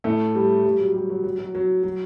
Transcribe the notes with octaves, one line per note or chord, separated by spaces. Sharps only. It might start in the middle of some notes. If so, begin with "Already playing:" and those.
A2 A3
G3
G3
F#3
G3
F#3
F#3
F#3
F#3
F#3